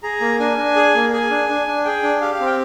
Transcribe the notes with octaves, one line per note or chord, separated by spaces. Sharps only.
G#4 A#5
A#3
D4 G#5
D4
G#4
A#3
G#4 G#5
D4
D4
D4
G#4 G5
D4
G4 F5
F5
C4
G5